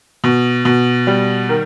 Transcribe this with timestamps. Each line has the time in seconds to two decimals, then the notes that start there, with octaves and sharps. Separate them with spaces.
0.24 B2
0.65 B2
1.07 G3
1.49 D#3